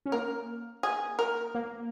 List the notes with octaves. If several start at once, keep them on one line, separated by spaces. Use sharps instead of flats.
C#4
A#3 A#4
G#4
A#4
A#3